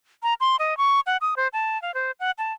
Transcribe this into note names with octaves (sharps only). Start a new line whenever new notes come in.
A#5
C6
D#5
C#6
F#5
D#6
C5
A5
F5
C5
F#5
A5